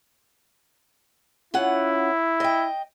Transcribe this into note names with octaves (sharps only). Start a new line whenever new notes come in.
C#4 E4 F4 F#5
D#5 G5